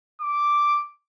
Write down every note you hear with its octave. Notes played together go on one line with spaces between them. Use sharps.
D6